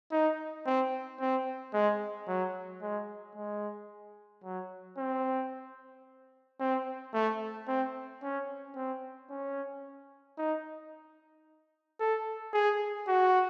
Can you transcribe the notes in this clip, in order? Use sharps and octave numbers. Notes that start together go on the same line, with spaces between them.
D#4
C4
C4
G#3
F#3
G#3
G#3
F#3
C4
C4
A3
C4
C#4
C4
C#4
D#4
A4
G#4
F#4